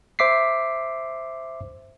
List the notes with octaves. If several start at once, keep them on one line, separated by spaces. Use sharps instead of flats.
C5 E5 D6 B6 C7